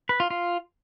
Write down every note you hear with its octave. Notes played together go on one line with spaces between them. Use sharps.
B4
F4
F4